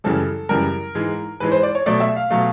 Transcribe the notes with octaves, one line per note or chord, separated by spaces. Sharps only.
F#2 C#3 E3 G3 A4
F#2 C#3 E3 G3 A#4
G#2 E3 G#3
G#2 E3 G#3 B4
C5
D5
C#5
B2 F#3 A3 D5
E5
F5
B2 F#3 A3 F5